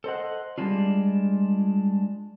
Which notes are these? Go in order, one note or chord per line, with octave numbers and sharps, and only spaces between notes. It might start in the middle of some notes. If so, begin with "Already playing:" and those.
A4 C5 D#5 F#5
G3 G#3 D4 F4